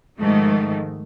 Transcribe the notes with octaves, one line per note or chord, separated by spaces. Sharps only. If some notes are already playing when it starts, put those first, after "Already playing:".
G#2 D#3 F3 A3